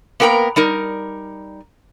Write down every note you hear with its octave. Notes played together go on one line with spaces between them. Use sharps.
A#3 B3 A#4 G5 A#5
G3 D#4 A#4